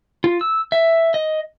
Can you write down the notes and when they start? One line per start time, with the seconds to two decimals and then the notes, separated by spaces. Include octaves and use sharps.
0.24 F4
0.41 E6
0.72 E5
1.14 D#5